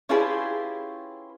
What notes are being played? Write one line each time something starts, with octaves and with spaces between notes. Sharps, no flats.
C#4 E4 F4 G4 G#4 B4